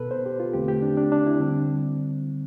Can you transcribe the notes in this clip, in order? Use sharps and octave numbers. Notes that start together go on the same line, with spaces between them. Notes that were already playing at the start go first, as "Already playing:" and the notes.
Already playing: B2 B3 A4 B4
C5
G4
F4
E2 D3 A3 C4 G4
G4
D4
D4
D4
E4
D3 G3 C4